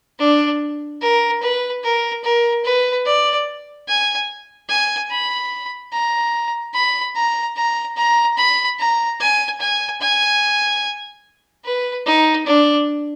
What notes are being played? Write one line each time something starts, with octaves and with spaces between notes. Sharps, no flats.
D4
A#4
B4
A#4
A#4
B4
D5
G#5
G#5
B5
A#5
B5
A#5
A#5
A#5
B5
A#5
G#5
G#5
G#5
B4
D#4
D4